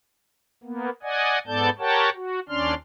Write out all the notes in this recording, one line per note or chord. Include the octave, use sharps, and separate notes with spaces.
A#3 B3
D5 D#5 F#5 G#5
G#2 B3 A4 D5 A5 G6
G4 A#4 C#5 F#5 G5 A5
F#4
D#2 C#4 D4 D5 C6 F6